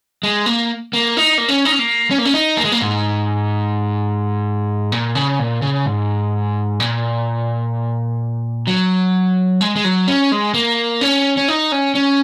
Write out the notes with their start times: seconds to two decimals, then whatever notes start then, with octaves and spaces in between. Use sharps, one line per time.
0.23 G#3
0.46 A#3
0.93 A#3
1.17 D#4
1.38 A#3
1.49 C#4
1.65 D#4
1.72 C#4
1.79 A#3
2.11 C#4
2.18 A#3
2.25 C#4
2.34 D#4
2.57 A#3
2.65 G#3
2.72 A#3
2.81 G#2
4.92 A#2
5.15 C#3
5.39 A#2
5.62 C#3
5.86 G#2
6.80 A#2
8.67 F#3
9.61 G#3
9.76 G#3
9.84 F#3
10.07 C#4
10.32 G#3
10.54 A#3
11.01 C#4
11.37 C#4
11.48 D#4
11.72 C#4
11.95 C#4